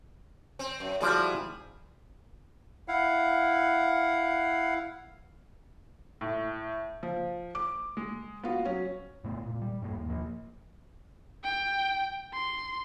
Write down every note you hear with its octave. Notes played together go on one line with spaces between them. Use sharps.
C4
F#2
F3 G3 E4 F#4 G#4 D5
E4 F5 F#5
A2
F3
D6
G#3
B3 F4 F#4
F#3 C#4
A2 A3 B3
A#2
G3
G2 A#3
D#2
F3 A#3
G5
C6